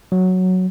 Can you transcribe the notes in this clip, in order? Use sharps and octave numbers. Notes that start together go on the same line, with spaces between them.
F#3